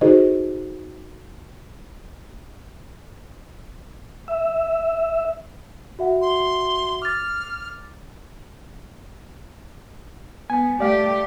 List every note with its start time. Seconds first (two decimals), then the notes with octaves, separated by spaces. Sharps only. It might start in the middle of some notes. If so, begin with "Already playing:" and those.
0.01 D#4 F#4 G#4 A4 C5 D#5
4.28 E5
5.99 F#4 E5 F#5
6.21 C6
7.02 D6 F6 A6
10.50 B3 G#5
10.80 A3 G4 D5 F5